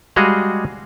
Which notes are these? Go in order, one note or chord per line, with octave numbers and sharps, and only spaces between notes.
G3 G#3 F#4 G#4 D#5 F5